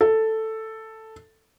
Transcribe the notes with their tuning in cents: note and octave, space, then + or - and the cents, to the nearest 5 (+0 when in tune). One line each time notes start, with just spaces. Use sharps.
A4 +5